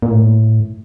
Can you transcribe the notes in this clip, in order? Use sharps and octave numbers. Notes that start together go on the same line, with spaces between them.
A#2
A2